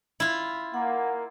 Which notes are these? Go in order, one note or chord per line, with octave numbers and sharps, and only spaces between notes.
E4 F4
A#3 F#5